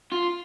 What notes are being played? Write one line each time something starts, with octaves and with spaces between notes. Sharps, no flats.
F4